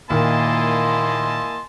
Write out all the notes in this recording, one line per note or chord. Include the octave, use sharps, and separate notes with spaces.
A#2 D#3 A#3 E4 D#5 G#5 A5 C6